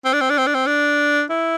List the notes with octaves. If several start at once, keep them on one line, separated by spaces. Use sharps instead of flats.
C4
D4
C4
D4
C4
D4
C4
D4
E4